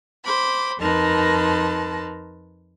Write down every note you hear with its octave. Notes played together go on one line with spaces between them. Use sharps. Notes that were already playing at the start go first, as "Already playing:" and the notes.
C5 B5 D6
F2 D#4 A#4 B4 A5 C6